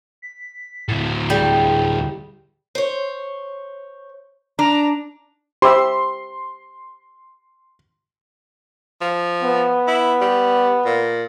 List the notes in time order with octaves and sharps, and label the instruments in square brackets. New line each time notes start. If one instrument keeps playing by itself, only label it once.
[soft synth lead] B6
[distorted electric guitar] D2 A2
[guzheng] G3 [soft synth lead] G#4
[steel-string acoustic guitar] C5 C#5
[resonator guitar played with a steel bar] D4 [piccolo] A#5
[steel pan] G4 E5 [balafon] C5 B5 D6 [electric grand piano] C6
[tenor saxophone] F3
[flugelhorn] B3
[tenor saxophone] E4
G3
A#2